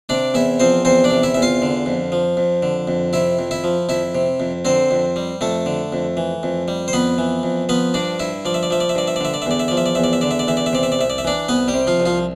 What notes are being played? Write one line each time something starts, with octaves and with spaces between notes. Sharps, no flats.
C3 D4 D5
E2 E4 E5
F3 C4 C5
E2 C4 C5
D4 D5
C3
E4 E5
E2 E5
F4 F5
D3
F2
F3
F2
D3
F2
C3 E4 E5
F2
E4 E5
F3
F2 E4 E5
C3
F2
D3 C4 C5
F2
G3
F2 A3 A4
D3
F2
E3
F2
G3
C5
F2 B3 B4
E3
F2
F3 B3 B4
G2 D4 D5
G2 E4 E5
F3 D5
E5
D5
F3 E5
D5
E5
G2 D5
E5
D5
D3 E5
D5
E5
E2 D5
E5
F3 D5
E5
D5
E2 E5
D5
E5
D3 D5
E5
D5
E2 E5
D5
E5
C3 D5
E5
D5
C2 E5
D5
E5
E3 D4 D5
C2 B3 B4
G3 G4
C3
F3 F4
C2
F3 F4